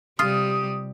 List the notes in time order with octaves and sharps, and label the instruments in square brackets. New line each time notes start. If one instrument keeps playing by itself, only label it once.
[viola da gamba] C3 G3 G4 [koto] F4 [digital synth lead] D#6